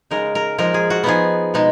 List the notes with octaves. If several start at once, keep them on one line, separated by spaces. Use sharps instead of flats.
C#3 G#3 D#4 A#4
A#4
F3 G#3 D#4 A#4
G#4
F#4
F3 B3 D#4 G#4
B2 G#3 D#4